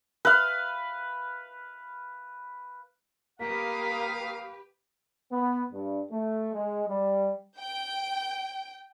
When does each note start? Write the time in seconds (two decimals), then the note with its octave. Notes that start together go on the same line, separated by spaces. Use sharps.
0.25 B4 F5
3.40 A#3 G4 B4 F5 D#6 B6
5.31 B3
5.72 G2
6.10 A3
6.53 G#3
6.88 G3
7.59 G5